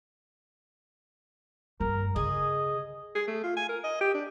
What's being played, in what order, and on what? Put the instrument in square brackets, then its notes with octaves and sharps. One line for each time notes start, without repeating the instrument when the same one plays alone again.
[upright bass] G2 [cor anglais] A#4
[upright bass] C#3 [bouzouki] G#4 [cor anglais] D#5
[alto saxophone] G#4
A3
F4
G#5
A#4
D#5
G4
D4